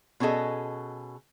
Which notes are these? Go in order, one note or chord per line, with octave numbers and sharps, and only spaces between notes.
B2 C#4 G#4 A4 D#5